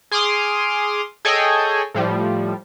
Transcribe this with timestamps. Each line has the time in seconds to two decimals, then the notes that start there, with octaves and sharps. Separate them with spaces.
0.11 G#4 C6 D6 D#6 F6
1.25 G#4 A4 C#5 D#5 G5 G#5
1.94 A2 F3 G3